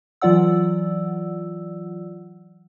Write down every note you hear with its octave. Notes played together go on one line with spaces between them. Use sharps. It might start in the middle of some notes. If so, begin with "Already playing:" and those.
E3 F#3 F4 D5 F#5 E6